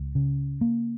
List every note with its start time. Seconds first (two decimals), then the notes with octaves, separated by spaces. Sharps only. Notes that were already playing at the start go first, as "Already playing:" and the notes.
Already playing: C#2
0.15 C#3
0.61 A#3